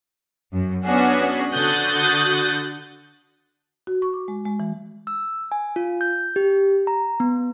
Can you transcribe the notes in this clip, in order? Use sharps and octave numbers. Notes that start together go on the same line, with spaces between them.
F#2
B3 C#4 D4 F#4 G#4
D3 F#4 D#6 F#6 G6 A6
F#4
C#6
D6
G#3
G#3
E3
E6
G#5
F4
G6
G4
A#5
B3